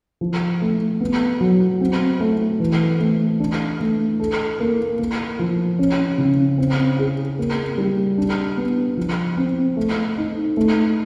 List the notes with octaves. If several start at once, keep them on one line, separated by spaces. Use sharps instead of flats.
F3
A3
B3
F#3
C4
A3
E3
A3
D4
A3
A4
A#3
A#3
F3
C#4
C#3
C4
G#4
A#3
G3
D4
B3
F3
C4
A3
D#4
A3